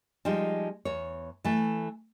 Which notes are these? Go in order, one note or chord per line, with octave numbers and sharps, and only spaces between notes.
F3 G3 G#3 D#4
E2 C#5
E3 A3